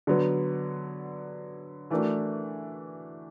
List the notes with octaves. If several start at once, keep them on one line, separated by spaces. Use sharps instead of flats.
D3 F#3 B3
E3 A3 D4 F#4 A#4